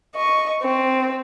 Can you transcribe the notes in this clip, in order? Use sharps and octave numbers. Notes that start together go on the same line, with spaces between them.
D#5 C#6
C4